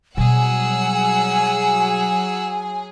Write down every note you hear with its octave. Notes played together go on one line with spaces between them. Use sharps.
B2 F#3 G3 G#4 F#5 G#5 E6